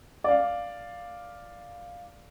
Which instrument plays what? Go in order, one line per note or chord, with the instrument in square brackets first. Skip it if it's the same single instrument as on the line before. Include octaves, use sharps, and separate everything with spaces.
[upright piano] D5 F5